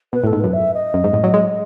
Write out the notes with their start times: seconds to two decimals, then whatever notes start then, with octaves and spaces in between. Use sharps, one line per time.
0.13 B2 B4
0.24 A2 A4
0.32 G#2
0.40 F#2 B4
0.53 E5
0.74 D#5
0.94 F#2
1.04 G#2
1.13 A2
1.24 F#3
1.34 G#3